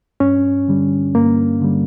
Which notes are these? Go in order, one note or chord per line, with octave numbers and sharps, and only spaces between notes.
G2 C#4
D3 G3
G2 A#3
D3 G3